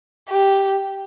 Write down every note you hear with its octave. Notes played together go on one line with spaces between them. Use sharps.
G4